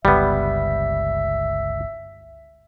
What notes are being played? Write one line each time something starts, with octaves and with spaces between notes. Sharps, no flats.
G1 C#2 G3 B3 E5